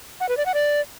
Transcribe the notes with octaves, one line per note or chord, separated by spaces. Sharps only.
F#5
B4
D5
F#5
D5